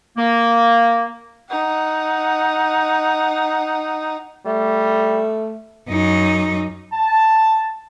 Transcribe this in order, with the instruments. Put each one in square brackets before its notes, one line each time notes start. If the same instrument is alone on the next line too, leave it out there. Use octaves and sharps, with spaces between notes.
[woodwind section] A#3
[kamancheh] D#4 F#5
[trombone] G3 [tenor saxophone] A3
[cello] F#2 D#4
[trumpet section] A5